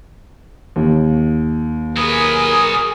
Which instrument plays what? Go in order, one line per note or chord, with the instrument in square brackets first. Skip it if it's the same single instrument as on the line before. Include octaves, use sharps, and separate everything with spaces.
[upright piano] D#2
[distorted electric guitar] F#3 B4 [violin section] G#4 A#4 [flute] D#6